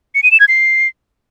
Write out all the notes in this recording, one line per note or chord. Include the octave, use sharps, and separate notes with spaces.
C#7
D#7
E7
G#6
C7